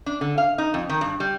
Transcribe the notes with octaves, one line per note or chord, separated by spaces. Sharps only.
D4
D3
F5
D#4
F2
D#3
G2
G3